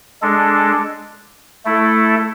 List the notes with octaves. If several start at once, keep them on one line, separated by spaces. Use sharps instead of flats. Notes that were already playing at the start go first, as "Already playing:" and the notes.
G#3 D4 A4
A3 E4 A4